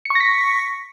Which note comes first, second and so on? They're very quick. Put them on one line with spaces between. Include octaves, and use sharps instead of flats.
C#7 C#6 A#6 B6